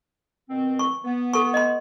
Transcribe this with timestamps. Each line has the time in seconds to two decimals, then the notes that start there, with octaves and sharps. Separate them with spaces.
0.49 B2 D#3 C4
0.79 C#6
1.05 B3
1.33 A4 C#6
1.54 D#5 C6